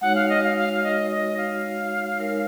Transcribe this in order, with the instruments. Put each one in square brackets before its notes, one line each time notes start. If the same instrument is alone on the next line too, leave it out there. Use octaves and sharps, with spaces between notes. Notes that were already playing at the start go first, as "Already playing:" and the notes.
[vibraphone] G#3 D#4 F#4 C#5 [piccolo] F#5
[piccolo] F5
D#5
F5
F5
F5
D#5
D#5
F5
[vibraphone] G#3 D#4 A#4 C#5